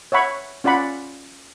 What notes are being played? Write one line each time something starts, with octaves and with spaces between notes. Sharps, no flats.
C#5 E5 F#5 B5 C#6
C#4 F4 D5 F#5 B5